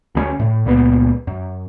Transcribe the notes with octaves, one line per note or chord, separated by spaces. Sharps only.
D2 G#3 C#4
A2
C#2 A#2 B3
F#2